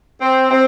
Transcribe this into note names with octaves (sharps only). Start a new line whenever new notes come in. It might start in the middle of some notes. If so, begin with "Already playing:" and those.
C4
C4